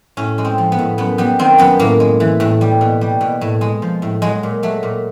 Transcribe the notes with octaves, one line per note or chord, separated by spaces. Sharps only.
A2 C#4
G#3
C4
F3
B3
A2
F#2 B3
G3 B3
D#3 C4
F#2 B3
A2 A#3
G#3
E3
A2
G3
B2
G3
B2
A2
G#3
F3
A2
F#3 G#3
A#2
F#3 A3
A#2